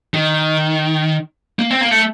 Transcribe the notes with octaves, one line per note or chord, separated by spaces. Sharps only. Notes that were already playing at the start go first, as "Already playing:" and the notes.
D#3
A#3
C4
A#3
A3